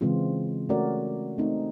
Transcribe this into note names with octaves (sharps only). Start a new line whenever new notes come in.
C#3 E3 G#3 C4 F4
A3 C#4 F#4 A#4 D5
A3 C4 D#4